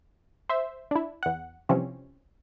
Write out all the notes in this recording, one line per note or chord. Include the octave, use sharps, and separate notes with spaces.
C5 E5
D4 E4
E2 F#5
C3 E3 F3 G3 C4 C#4